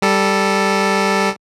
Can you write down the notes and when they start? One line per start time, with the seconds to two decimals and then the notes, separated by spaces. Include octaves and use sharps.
0.02 G3 A4